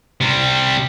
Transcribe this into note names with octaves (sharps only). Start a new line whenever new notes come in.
C3 G3